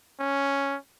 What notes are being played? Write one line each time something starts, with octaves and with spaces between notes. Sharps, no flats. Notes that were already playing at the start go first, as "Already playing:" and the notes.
C#4